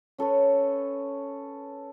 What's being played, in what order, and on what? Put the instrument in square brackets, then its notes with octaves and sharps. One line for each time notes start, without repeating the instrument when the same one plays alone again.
[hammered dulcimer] C#4 A4 B4 C#5